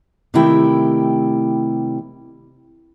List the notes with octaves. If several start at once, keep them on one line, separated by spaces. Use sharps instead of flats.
C3 D#3 G3 A3 E4 G5